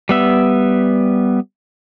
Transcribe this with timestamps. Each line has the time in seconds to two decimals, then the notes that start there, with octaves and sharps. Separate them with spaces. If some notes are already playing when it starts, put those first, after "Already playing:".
0.09 G3 B3 E5